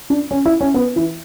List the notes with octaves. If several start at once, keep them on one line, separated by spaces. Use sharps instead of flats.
D4
C#4
E4
C#4
B3
E3